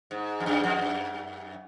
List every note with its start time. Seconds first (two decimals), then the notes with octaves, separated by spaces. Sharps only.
0.11 G#2
0.40 F2
0.46 F#2
0.64 F2
0.81 F#2